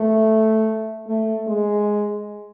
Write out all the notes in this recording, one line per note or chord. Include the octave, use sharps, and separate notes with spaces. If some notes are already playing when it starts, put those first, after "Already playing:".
Already playing: A3
A3
G#3